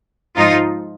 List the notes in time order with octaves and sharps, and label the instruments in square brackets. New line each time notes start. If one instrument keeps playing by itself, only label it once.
[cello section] G#2 F3 D#4 F4